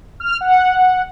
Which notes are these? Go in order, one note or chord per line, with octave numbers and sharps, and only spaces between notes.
F6
F#5